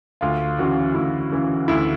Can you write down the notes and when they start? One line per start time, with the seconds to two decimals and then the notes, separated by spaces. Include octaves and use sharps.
0.21 D2 F4
0.59 C#3 E3 F#4
0.94 D2 E4
1.31 C#3 E3
1.68 D2 E4